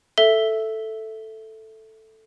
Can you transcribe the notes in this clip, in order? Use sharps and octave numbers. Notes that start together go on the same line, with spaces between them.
A4 E5 G7